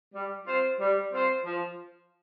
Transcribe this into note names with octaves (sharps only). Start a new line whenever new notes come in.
G3
C4 F4 C5
G3
C4 F4 C5
F3